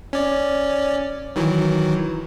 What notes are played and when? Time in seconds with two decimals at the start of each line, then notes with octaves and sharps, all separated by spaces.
0.13 C#4 D5
1.36 D#3 E3 F#3